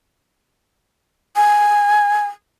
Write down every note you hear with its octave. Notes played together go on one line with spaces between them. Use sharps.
G#5